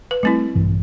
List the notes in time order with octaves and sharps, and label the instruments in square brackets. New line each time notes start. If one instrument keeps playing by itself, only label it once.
[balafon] B4
[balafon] G3 C4 E4 [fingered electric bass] A3
[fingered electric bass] A#1 G2 E3